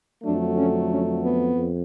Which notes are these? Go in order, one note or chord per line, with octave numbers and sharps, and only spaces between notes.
F2 D3 F#3 A3 D4
C#4
C#4
B3
F2